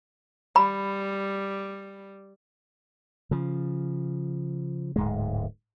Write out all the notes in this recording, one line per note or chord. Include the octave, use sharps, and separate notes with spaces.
G3 B5
C#3 F3
D1 G#2 G#3